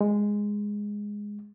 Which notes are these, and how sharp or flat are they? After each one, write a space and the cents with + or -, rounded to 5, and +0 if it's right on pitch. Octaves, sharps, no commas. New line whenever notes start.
G#3 -10